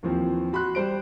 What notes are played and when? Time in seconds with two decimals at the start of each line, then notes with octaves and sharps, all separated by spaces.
0.03 D#2 E3 F3 C4
0.53 F#4 B5 C6 F#6
0.75 G3 C5 D7